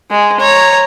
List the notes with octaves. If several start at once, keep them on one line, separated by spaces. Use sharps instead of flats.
G#3
C#5 A#5